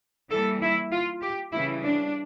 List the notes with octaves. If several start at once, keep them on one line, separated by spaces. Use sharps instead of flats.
E3 G3 A#3 A4
E4
F4
G4
C#3 E3 G3 E4
D4